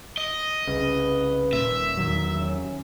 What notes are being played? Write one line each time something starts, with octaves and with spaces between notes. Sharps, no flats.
D#5
C2 C#3 B4
D#1 G#1 A#2 E5
E2 D#3 F#3
C#4